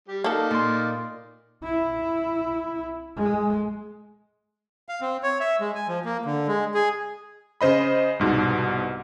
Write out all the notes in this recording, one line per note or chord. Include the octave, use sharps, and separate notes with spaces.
G3 G4
A#3 D#4 A4 D5 F6
A#2 C6
E4
G#3
F5
C4
C#5
E5
G#3
G#5
F3
A#3
D3
G#3
G#4
C#3 C5 D#5 B5
C2 G#2 B2